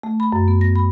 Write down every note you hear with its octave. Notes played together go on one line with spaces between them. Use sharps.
A3
B5
F#2
B3
A#6
B5